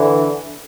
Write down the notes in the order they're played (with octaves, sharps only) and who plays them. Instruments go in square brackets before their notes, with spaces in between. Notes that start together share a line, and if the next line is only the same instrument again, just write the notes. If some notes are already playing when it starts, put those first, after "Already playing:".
Already playing: [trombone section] D3 E3